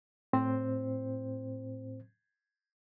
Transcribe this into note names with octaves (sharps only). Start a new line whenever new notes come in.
A2 C4 C5